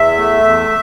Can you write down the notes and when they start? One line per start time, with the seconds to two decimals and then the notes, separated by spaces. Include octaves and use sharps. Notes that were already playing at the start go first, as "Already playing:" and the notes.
Already playing: E2 E5
0.17 A3
0.43 E2